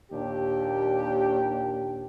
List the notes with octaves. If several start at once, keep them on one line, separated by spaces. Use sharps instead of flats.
D#2 A#2 D4 G4